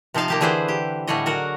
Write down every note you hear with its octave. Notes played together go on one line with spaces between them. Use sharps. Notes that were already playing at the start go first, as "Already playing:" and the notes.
C3 F3 D#4 F5 A5
A#3 G4 A5
D3 E3 G#4 B4 C5
G4
A2 D3 G3 G#4 C#5 D#5
F#3 F#4 A#4